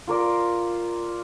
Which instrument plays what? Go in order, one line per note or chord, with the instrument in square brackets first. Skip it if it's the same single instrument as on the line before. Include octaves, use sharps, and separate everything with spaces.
[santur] F4 A#4 D5